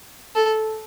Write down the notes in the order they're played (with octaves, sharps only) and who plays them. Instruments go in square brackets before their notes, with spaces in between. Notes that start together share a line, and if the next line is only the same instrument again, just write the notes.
[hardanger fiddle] A4